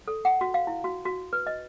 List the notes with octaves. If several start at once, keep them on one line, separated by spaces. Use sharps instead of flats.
A4
F#5
F#4
F5
E4
F#4
F#4
B4
D#5